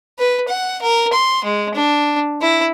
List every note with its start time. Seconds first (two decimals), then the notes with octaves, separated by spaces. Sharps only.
0.19 B4
0.49 F#5
0.82 A#4
1.13 C6
1.44 G#3
1.75 D4
2.41 E4